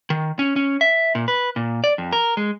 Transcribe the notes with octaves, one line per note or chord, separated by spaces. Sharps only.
D#3
C#4
C#4
E5
A#2
B4
A#2
D5
F2
A#4
G#3